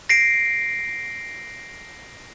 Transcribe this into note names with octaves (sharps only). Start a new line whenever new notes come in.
A#6 C7 D7